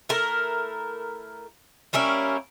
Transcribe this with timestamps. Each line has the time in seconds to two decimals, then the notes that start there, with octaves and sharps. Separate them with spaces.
0.09 A3 E4 A#4
1.93 G3 A#3 C#4 E4